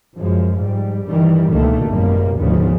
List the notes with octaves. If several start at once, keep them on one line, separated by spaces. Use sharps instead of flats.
F#2 F3 G#3
G#2 G3
G2 D#3 E3 G3
C#2 B2 D3 D#3 A3 A#3
G#1 F#2 B2 G3 A#3
F1 D2 G#2 C#3 F3 B3